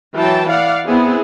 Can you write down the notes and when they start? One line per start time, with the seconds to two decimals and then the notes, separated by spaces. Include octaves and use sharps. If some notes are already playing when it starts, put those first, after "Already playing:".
0.15 E3 F#3 G5 A5
0.49 D5 F5 F#5
0.85 B3 C4 E4 G#4